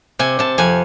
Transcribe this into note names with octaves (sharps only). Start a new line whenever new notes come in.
C3 G#5
C3 A5
F2 G#5